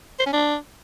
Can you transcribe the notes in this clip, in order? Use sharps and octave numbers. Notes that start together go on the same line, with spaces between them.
C5
C#4
D4